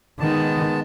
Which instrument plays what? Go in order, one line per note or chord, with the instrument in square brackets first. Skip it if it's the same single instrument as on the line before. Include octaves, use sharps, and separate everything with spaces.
[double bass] D#3 [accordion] G#3 B3 A5